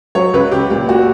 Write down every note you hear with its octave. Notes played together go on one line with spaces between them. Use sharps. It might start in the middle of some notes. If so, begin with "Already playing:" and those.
F#3 C#5
C#2 B4
C#2 G4
A#2 G4
A#2 F#4